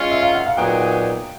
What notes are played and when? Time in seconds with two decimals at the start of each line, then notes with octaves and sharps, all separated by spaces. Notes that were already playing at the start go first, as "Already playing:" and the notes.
Already playing: G#3 C#4 F4
0.11 E5
0.22 F5
0.34 F#5
0.46 F5
0.57 A#2 F#3 B3 D#4 G#4 G5